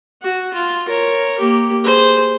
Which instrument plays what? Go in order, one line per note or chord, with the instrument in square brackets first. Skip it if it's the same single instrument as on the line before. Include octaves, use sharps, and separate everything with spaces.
[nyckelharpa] F#4
F4
A#4 C#5
A#3 G4
G#4 C5